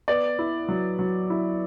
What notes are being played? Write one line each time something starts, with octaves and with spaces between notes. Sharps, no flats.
B3 D5
E4
F#3
F#3
E4